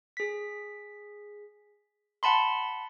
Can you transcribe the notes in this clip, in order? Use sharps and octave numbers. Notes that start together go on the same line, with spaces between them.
G#4 B6
F#5 A5 B5 C6